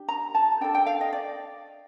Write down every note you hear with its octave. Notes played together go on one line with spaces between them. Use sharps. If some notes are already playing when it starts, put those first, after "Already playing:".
Already playing: D4 G4
A#5
A5
D4 A4 G5
G5
F5
D#5
D5